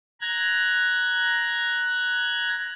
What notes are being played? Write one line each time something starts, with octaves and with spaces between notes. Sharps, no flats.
A#5 F#6 G#6